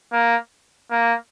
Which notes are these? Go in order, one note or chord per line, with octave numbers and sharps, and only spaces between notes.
A#3
A#3